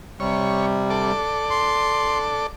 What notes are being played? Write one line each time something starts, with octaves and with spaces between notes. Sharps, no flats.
C3 G3 C#5
A4 D5
C6